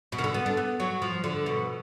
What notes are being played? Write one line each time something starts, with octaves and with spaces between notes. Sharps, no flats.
B2
D#3
D3
B3
D4
B3
F#3
F3
D3
B2